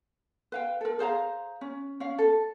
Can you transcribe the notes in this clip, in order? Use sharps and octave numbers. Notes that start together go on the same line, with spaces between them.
B4 F5 G5
A4 A#4
G#4 C5 F5 A#5
C#4
C#4 F5
A4